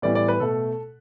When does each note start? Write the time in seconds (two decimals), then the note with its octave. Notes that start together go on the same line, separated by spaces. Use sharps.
0.02 A2 E3 G3 B3 D5
0.15 D5
0.28 B4
0.40 B2 A3 A4